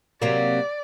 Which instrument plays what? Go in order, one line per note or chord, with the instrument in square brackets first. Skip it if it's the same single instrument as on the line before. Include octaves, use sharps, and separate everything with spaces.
[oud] C3 F#3 A#3 [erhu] D5